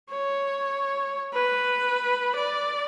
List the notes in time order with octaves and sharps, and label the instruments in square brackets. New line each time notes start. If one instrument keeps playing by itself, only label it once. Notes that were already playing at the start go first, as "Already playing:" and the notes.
[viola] C#5
B4
D5